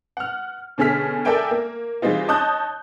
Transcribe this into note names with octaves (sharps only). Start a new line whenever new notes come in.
F#5 F6
B2 D3 C#4 G#4 F6 B6
A4 A#4 D5 E5 G5 G#5
A#3
E3 G3 G#3 C4 D#4 F4
C#5 D#5 A5 D#6 F#6 G6